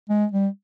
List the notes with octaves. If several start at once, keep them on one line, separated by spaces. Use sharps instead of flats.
G#3
G3